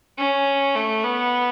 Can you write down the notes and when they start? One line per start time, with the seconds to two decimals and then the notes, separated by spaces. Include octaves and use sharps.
0.18 C#4
0.75 A3
1.04 B3